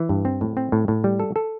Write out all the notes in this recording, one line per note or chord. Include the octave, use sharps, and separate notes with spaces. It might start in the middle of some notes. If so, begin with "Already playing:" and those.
Already playing: E3
G2
C4
A2
C4
A2
A2
G3
A4
A4